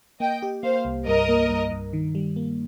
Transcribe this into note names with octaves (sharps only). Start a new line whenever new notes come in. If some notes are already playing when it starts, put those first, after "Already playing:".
A#3 D#5 G5
G4
A#3 C5 F5
C2
G2 A#4 D#5
A#3
G2
G2
D#3
G3
A#3